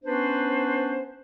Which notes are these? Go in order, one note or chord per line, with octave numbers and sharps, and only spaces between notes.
B3 C#4 D4 B4 C5